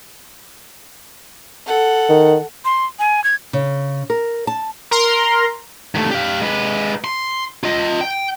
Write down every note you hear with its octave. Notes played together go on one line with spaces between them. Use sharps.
A4 F#5
D#3
C6
G#5
G#6
C#3
A#4
A5
A#4 A#5 C6
D#2 A3
G4 F5
G#3 B4
C6
F4 D#5
G5